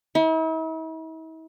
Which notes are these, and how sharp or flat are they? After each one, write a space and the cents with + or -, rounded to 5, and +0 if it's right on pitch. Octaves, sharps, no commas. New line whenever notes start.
E4 -45